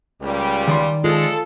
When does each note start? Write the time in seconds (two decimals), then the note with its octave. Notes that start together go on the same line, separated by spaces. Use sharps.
0.21 C#2 A#2 G3
0.68 D#3 D5 C6
1.04 G#3 F4 A4